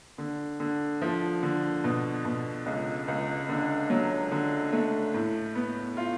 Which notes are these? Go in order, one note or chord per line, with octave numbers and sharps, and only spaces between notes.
D3
D3
F3
D3
B2
B2
C#2
C#2
D3
F#3
D3
A3
A2
B3
F4